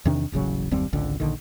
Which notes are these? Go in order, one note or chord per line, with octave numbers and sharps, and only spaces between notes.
E2 C3 D#3 D4
D#1 A1 C#3 F#3
F#1 D#2 G3 C4
G#1 C#2 D3
A#1 D3 D#3